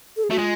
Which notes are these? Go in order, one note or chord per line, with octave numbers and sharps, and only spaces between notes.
A4
G#4
A3 F#4
G#3 F4